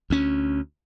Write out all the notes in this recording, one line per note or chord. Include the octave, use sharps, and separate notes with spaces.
D2 C#4